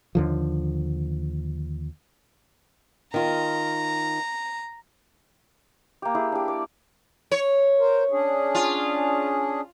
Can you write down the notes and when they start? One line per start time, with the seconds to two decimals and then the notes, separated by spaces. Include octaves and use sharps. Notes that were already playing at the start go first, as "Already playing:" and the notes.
0.15 D#2 D3 F3
3.14 D#3 F4 A#5
6.02 A#3 G4
6.15 E4 G4 G#4
6.32 D4 G4
6.48 D5
7.32 C#5
7.79 A#4 C5
8.11 C#4 D4 G#4
8.55 F4